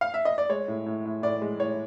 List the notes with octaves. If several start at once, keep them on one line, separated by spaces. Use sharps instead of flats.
F5
E5
D#5
D5
G#3 C#5
A2
A2
A2
A2 D5
G#3
A2 C#5